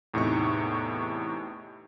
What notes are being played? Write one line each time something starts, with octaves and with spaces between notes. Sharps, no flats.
E2 A2 C3 D#4 C#6